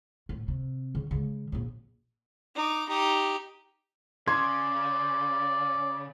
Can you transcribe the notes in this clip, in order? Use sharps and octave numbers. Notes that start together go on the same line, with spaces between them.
A2
C3
C#3
C#3 G#3
A#1 F#2
D#4 D6
D#4 G4
C#3 D5 C6 G#6